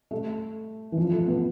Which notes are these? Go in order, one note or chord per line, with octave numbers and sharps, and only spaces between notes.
A3
E3
F3
A3
B3